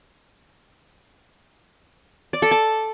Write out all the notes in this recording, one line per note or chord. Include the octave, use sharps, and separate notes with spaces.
D5
A4
A5